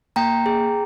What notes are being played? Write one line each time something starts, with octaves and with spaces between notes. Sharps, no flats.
A#3 G5 A#5
G#4